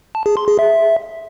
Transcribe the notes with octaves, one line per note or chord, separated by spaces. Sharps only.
A5
G#4
C6
G#4
E5